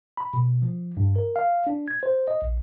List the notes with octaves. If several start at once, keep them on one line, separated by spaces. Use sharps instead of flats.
B5
B2
F3
G2
A#4
F5
D4
G#6
C5
D#5
A#1